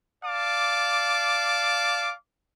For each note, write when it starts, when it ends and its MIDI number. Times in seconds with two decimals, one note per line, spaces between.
0.24 2.12 74
0.24 2.12 77
0.24 2.12 81
0.24 2.12 86